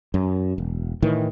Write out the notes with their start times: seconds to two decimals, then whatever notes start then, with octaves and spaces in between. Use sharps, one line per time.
0.14 F#2
0.58 E1
1.02 A2 D#3 E3